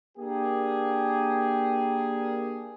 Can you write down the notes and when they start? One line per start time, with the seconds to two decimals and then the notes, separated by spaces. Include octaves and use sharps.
0.18 A#3 D4 G4 G#4